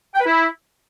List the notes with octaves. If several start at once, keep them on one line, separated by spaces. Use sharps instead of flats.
G5
B4
E4